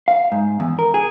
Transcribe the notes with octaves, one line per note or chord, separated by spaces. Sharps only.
F5
G#2
E2
A#4
G#4